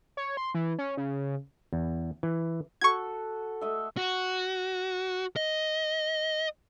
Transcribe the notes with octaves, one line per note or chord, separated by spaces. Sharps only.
C#5
C6
E3
C#4
C#3
E2
E3
F#4 A4 C#6 G#6
A3 D#5 E5
F#4
D#5